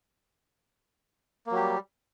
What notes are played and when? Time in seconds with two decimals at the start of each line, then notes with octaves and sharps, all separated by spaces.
1.46 A#3
1.51 F#3
1.56 G4
1.61 G3